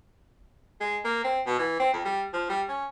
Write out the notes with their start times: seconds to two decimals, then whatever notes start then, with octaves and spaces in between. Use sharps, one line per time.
0.81 G#3
1.05 A#3
1.24 C4
1.46 B2
1.59 E3
1.80 C4
1.93 F2
2.05 G3
2.33 F3
2.49 G3
2.68 C#4